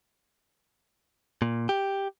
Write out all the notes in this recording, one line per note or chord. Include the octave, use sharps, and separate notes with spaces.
A#2
G4